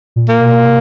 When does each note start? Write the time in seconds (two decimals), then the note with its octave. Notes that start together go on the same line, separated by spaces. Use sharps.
0.16 A#2
0.29 A#3
0.41 B2
0.64 C3